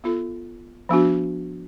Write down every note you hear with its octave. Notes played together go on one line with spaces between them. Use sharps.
B3 F4 A4
F3 B3 D4 F#4